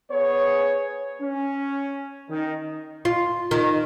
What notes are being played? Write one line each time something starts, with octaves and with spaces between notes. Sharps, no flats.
B3 G#4 C#5
C#4
D#3 D#4
F4
D#3